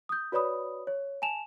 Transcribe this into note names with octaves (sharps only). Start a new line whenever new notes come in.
D#6 G6
F#4 B4 C#5 D5 B5 D#6
C#5
G#5 A5 E7 F7